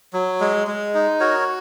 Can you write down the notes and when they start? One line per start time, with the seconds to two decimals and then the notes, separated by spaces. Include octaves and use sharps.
0.13 F#3
0.40 G#3
0.67 G#3
0.94 D#4
1.20 F#4 A#4 C#5